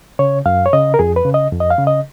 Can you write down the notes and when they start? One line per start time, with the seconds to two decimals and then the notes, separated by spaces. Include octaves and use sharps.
0.19 C#3 C#5
0.46 F#2 F5
0.66 C#5
0.73 C#3 D#5
0.94 A#4
0.99 F2 G#4
1.16 B4
1.25 C#3
1.34 D#5
1.52 F2
1.60 D#5
1.70 F5
1.79 C#3
1.87 D#5